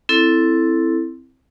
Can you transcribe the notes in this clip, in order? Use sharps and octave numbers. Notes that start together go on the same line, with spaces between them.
C4 E4 A4